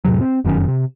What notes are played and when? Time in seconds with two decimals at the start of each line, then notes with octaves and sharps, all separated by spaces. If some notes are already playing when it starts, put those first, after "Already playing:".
0.05 F2 A2 C3 F#3
0.20 C4
0.44 F1 F#2 D#3 C#4
0.68 C3